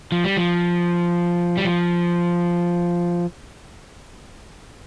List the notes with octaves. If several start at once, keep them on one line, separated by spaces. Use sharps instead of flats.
F3
G3
F3
G3
F3